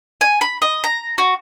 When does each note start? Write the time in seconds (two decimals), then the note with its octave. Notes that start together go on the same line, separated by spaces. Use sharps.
0.21 G#5
0.41 B5
0.62 D#5
0.84 A#5
1.18 F#4